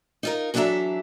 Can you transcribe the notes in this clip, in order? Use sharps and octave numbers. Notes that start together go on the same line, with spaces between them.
D#4 F4 A#4
E2 F#3 D4 A4 E5 A#5